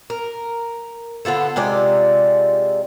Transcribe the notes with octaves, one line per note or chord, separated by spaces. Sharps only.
A#4
D3 B3 F4 A4
C3 G#3 F4 D5